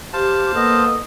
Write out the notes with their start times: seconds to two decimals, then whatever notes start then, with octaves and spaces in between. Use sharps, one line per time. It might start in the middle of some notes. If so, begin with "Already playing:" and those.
0.13 G4 C5 F5 A5
0.55 A#3 B3 A4 D#5